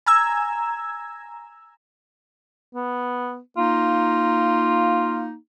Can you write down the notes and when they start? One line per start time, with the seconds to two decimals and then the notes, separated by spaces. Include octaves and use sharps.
0.06 G#5 A#5 E6 G#6
2.75 B3
3.57 A#3 D#4 F4